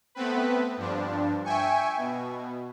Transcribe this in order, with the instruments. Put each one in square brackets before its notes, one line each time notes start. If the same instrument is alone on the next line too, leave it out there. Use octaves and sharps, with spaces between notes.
[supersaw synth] A3 B3 C4 B4
G2 F3 D4
E5 G5 G#5 C#6
B2